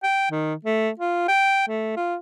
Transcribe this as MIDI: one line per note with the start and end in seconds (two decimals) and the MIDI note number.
0.03 0.29 79
0.31 0.54 51
0.65 0.90 57
0.99 1.25 65
1.28 1.66 79
1.68 1.93 57
1.96 2.16 65